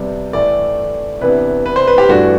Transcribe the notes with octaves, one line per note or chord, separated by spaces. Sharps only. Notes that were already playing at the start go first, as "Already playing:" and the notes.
Already playing: C3 G3 B3 D4
A2 E3 A3 D5
C3 E3 B3 D4 B4
B4
C5
B4
G4
G2 E3 A3 D4 F#4